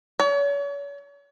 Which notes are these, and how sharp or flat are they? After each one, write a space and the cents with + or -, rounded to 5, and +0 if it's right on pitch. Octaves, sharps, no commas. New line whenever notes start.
C#5 +40